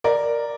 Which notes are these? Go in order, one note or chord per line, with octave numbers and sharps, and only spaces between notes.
A#4 D5